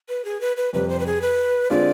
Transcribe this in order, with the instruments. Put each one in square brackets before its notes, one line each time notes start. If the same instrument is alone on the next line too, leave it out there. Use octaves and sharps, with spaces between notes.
[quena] B4
G#4
B4
B4
[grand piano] F2 C3 G3 [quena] B4
[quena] C5
B4
G#4
B4
[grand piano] D3 G#3 C4 F4 [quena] D5